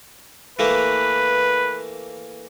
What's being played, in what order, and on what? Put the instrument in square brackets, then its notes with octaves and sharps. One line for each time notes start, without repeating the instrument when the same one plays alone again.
[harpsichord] E3 A3 A#3 [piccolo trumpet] B4